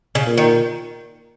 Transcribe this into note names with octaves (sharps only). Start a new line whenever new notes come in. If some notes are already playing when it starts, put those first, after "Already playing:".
C#3
A#2
D#3